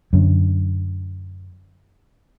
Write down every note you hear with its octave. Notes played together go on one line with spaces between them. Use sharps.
F#2 D3